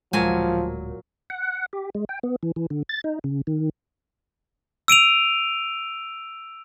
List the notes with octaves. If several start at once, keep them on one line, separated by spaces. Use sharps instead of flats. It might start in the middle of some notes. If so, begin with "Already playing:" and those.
D1 A#2 F3 F#3 G#3 G#5
F#5
G4
G#3
G5
B3
E3
E3
D3
A6
D#4
C#3
D#3
E6 D7 D#7 F7